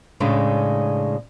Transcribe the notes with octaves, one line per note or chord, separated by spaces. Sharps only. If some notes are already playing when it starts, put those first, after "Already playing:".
A2 C#3 G#3 A3 D4